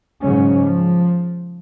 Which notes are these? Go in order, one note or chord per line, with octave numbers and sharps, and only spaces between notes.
G#2 C#3 F#3 C#4
F3